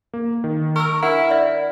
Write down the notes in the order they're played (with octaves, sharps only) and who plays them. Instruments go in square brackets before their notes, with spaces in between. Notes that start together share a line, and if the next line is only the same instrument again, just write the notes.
[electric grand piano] A#3
D#3
[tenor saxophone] A#4 [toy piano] C#6 E6
[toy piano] D4 A#4 F#5 [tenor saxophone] E4 [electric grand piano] F6 B6
[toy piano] D5 E5